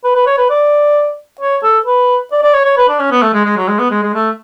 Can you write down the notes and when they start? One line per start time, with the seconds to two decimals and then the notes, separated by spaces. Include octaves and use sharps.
0.04 B4
0.15 B4
0.26 C#5
0.38 B4
0.50 D5
1.41 C#5
1.63 A4
1.86 B4
2.32 D5
2.42 D5
2.54 C#5
2.65 C#5
2.77 B4
2.89 D4
2.99 C#4
3.11 B3
3.22 A3
3.34 G#3
3.45 G#3
3.57 F#3
3.68 G#3
3.79 B3
3.91 G#3
4.02 G#3
4.14 A3